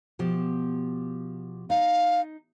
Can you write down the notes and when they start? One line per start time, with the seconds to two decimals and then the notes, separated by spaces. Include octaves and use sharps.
0.19 B2 F3 G4
1.70 D#4 F5